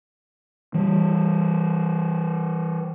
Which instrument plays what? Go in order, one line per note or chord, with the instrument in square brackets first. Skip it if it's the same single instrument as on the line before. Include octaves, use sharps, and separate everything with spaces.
[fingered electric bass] E3 G3